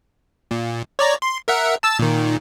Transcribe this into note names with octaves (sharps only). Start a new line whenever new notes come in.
A#2
C#5 D5 A#5
C6
A#4 E5 F#5
A5 E6 A6
A#2 D#3